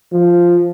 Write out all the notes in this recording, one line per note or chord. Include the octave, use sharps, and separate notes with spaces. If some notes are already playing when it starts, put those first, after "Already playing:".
F3